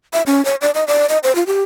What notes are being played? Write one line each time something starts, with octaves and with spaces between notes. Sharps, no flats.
E5
C#4
C#5
D5
D#5
D5
D#5
C5
F4
G4